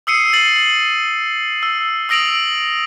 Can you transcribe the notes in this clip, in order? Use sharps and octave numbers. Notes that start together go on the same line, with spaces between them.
D#6 E6 C7 C#7 D#7
A6 C7 F#7
E6
D#6 E6 A#6 D7 F7 F#7